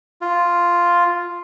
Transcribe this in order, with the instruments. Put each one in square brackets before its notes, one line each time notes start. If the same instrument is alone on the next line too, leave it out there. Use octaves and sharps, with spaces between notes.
[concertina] F4